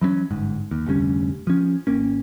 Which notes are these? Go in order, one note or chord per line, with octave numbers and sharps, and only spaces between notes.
E3 F#3 A#3 C#4
G1 G#2
D#2
F1 D2 G3 C#4
F3 C#4
G#1 A#3 C#4